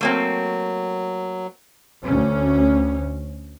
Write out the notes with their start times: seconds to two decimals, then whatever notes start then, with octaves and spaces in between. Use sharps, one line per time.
0.01 F#3 A3 A#3 C4
2.04 D2 C#4